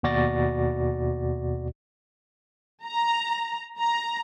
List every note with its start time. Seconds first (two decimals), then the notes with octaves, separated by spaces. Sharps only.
0.03 D#2 B2 F#4 D5 A6 A#6
2.85 A#5
3.79 A#5